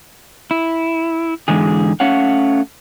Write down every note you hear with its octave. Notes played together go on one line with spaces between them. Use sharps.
E4
G#2 D3 E3 G#3 G#4
A3 C#4 C#5 F5 F#5